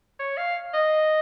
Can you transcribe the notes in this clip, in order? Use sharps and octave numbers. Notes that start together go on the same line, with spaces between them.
C#5
F5
D#5